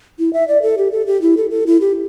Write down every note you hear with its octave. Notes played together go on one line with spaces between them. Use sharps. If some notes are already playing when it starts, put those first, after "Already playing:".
E4
E5
D5
A4
G4
A4
G4
E4
A4
A4
E4
G4